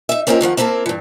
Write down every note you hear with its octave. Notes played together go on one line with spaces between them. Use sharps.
D#4 E5
A#3 C4 C#4 D#4 F4 A#4
F2 D#3 F3 F#5
A#3 C4 E4 A4 A#4
G2 E3